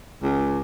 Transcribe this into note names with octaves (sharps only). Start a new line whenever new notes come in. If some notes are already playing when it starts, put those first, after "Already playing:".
C#2